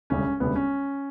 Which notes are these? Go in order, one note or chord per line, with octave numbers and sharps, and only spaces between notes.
E1 D2 C#3 G3 C#4
E1 D2 C#3 G3 B3
C#4